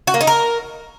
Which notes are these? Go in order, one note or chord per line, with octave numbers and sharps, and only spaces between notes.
F#4
A#3
D#4
A#4